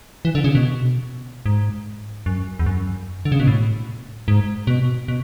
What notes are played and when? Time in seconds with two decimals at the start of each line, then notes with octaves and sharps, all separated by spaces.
0.25 E3
0.35 D3
0.44 C#3
0.55 B2
1.46 G#2
2.26 F#2
2.59 E2
2.66 F#2
3.25 D3
3.32 C#3
3.40 B2
3.47 A2
4.28 G#2
4.67 B2
5.08 B2